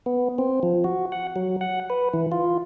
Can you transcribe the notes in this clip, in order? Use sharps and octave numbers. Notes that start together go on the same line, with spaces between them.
B3
C4
F3
F#4
F#5
F#3
F#5
B4
E3
F4